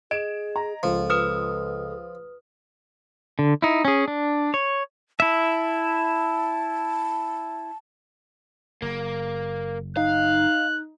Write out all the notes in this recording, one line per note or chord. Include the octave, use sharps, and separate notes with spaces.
G#4 D#5 D7 E7
A#5
C#2 F3 A4
B4 D#6 F6
D3
D#4 E4
C#4 G#4
D4
C#5
E4 E5 A5
F#1 A#3
D#4 F5 F#6